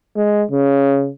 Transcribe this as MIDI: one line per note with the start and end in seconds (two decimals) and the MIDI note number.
0.17 0.43 56
0.51 1.10 49